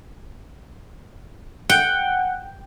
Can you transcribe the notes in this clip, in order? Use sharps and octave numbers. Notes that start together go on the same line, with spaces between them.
F#5 G5